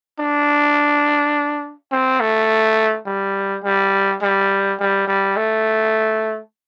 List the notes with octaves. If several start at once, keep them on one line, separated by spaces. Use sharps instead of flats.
D4
C4
A3
G3
G3
G3
G3
G3
A3